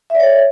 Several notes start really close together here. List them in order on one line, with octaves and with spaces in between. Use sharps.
E5 D5 C#5